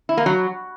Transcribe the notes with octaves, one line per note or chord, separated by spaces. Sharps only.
E4
A#3
F#3